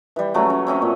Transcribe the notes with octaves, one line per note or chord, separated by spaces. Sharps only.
E3 G3
C#3 F#3 A3 C#4
C#4
C4 C#4 D#5 E5
A#2